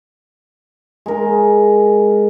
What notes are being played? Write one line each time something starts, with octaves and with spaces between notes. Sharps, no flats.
G#3 A#4